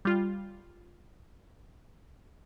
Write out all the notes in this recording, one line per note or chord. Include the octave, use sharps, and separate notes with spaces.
G3 F4